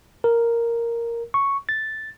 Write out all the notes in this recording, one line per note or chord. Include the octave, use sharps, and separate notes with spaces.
A#4
C#6
A6